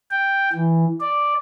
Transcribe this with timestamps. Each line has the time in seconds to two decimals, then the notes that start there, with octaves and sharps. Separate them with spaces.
0.11 G5
0.53 E3
1.01 D5